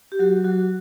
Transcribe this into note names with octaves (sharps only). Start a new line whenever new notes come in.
G4
F#3 F#4
F#3 F#4